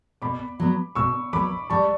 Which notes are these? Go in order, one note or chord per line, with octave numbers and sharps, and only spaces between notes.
B2 B5 D6
F#3 B3
B2 C#6 E6
F#3 B3 B5 D6
G3 A5 C#6